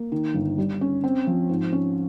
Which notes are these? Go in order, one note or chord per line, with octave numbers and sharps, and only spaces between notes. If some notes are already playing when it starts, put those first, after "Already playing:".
Already playing: A#3
D#3
G1
G3
C#4
C4
F3
G#2
C#4